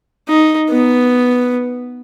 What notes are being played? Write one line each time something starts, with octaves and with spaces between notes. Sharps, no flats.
D#4
B3